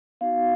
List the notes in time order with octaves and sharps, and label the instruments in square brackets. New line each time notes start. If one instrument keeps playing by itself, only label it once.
[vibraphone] B3 D#4 F#4 F5